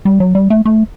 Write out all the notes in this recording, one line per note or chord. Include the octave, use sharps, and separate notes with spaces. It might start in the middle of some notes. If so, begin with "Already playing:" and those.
G3
F#3
G3
A3
A3